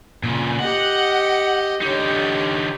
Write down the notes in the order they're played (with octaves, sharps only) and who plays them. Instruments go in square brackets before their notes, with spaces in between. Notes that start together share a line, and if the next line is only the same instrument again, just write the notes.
[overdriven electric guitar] A#2 C#3
[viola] G4 D#5 [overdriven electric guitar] F#5
[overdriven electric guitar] D3 D#4 [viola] G4 C#5